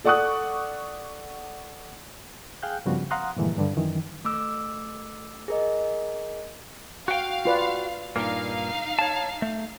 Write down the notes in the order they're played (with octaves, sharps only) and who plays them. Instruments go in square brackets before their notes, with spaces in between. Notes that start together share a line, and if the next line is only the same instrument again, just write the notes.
[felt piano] A4 D5 F#5 C#6 D#6 F#6
[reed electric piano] G#4 F5 G5 F#6 G6
G2 C#3 F3 G3 B3 F#4
F5 F#5 A#5 C6 D#6 F#6
G2 A#2 D3 E3 F3 G#3
G2 D3
F#2 D#3 E3
[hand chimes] A3 D6 E6
G#4 A#4 D#5
[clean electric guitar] F#4 G5 [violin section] F5
[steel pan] F4 B4 D5
[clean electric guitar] G2 A#2 A#3 [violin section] D#4 F5
[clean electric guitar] C#5 A5
A3